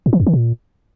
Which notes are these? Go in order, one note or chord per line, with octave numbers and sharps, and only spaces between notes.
A2
E3
F2
D#3
A#2